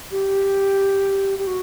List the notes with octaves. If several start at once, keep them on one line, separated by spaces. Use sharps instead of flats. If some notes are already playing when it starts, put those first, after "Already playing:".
G4
G4
F#4